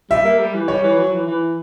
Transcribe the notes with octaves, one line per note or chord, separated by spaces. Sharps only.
G3 E5
A#3
G3
E3
G3 C#5
E3
F#3
E3
E3